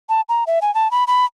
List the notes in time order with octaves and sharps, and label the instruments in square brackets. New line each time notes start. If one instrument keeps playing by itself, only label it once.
[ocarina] A5
A#5
E5
G#5
A5
B5
B5